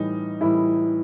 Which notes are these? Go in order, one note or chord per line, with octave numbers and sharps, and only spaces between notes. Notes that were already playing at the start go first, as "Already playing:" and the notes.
Already playing: A2 E3 G3 D#4
A2 E3 G3 E4